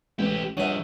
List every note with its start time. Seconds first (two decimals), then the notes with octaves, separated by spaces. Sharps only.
0.19 A1 G#3 E4 G4
0.57 G2 F3 G#4 C#5 D#5 E5 F#5